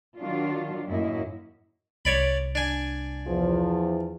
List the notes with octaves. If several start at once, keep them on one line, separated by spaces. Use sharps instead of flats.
D#3 F#3 D4 F4
F#2 A2 A#3 E4 D#5
C2 C#5 D5 B5
D4 G#5
E2 F3